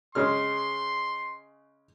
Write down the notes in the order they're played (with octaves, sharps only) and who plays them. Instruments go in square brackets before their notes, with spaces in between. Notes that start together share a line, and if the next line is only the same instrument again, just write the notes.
[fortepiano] C#3 G#3 F6 [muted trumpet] C6